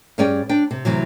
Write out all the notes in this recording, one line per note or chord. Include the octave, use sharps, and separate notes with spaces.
G2 G3 C#4 G#4 D5 G5
D4 G5
C3
D2 C3 E3 F#3